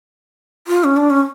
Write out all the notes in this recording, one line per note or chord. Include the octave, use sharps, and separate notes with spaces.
F4
C#4
D4
C#4